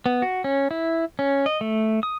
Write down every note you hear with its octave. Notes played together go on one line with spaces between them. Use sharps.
B3
F#4
C#4
E4
C#4
D#5
A3
D#6